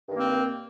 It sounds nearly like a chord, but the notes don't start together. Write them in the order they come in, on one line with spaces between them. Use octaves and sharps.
G2 D#3 A#3 C4